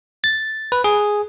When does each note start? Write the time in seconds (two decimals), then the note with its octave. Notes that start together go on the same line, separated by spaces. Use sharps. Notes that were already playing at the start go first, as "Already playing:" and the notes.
0.24 A6
0.72 B4
0.84 G#4